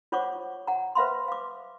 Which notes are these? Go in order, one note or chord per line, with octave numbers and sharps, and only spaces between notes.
F4 C5 C#5 F#5 C#6 D6
F#5 A#5
B4 C5 E5 F5 B5 C6
F5 D6